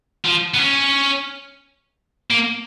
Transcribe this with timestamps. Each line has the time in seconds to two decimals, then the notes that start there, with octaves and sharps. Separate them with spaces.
0.25 F3
0.54 B3
0.58 C#4
2.31 A#3